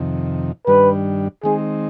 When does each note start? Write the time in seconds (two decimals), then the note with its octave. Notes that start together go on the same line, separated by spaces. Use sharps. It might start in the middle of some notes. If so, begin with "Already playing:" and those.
Already playing: F2 C3 D#3
0.67 G2 D#3 G3 D4 B4
1.44 D#3 G#3 C4 D#4 G#4